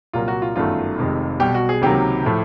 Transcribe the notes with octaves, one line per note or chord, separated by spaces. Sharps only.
C2 A#2 F#3 A#3 F4
F#4
F4
G1 F#2 D#3 F#3 A3 F4
F1 F2 C3 D#3 G#3
B1 B2 G3 G4
F#4
G#4
C#2 C3 D#3 F#3 A#3 G4
A2 F3 A3